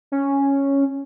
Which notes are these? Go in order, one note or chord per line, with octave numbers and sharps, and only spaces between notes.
C#4